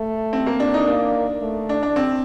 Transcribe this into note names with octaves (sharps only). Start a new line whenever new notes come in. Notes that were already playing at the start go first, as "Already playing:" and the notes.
Already playing: A3
C4
A#3
D4
D#4
A#3 D4
A3
D4
D4
C4